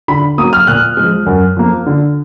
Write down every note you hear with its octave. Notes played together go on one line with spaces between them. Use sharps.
D3 B5
F#3 A#3 D#6
F6
A#2 F#6
F3 G#3
F#2
F3 A#3
D3